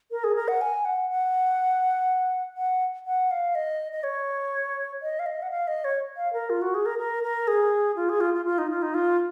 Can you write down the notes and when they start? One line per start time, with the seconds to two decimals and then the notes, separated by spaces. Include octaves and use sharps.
0.11 A#4
0.24 G#4
0.36 A#4
0.48 F#5
0.61 G#5
0.85 F#5
1.10 F#5
2.57 F#5
3.06 F#5
3.31 F5
3.55 D#5
3.92 D#5
4.03 C#5
5.02 D#5
5.19 F5
5.26 D#5
5.42 F#5
5.51 F5
5.68 D#5
5.84 C#5
6.16 F5
6.33 A#4
6.50 F4
6.62 F#4
6.75 G#4
6.86 A#4
6.99 A#4
7.23 A#4
7.48 G#4
7.96 F4
8.09 G#4
8.21 F4
8.34 F4
8.46 F4
8.58 D#4
8.70 F4
8.82 D#4
8.94 F4